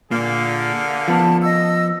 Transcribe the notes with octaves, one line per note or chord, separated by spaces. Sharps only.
A#2 D3 A#3 G#4
F3 B3 A5
D#5 E6